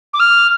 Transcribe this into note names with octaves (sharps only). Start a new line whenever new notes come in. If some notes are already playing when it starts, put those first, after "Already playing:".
D6
F6